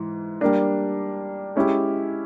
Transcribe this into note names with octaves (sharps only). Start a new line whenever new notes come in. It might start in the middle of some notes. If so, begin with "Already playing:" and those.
Already playing: G#2 E3
G3 A#3 D4
G#3 C#4 E4 G4